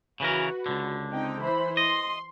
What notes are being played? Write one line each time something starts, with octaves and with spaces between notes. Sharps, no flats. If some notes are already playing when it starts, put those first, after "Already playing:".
C#3 E3 F#4 A#4 B4
C#2 D3
C4 D#4 G5
E3 C5 B5
D#5 C6